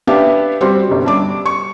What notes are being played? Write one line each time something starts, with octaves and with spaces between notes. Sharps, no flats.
B3 D4 G4 E5 F5
G3 C4 F#4 C6
G1 C3
G2 D4 D6
C#6